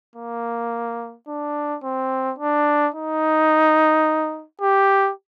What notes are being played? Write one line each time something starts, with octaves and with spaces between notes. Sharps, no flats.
A#3
D4
C4
D4
D#4
G4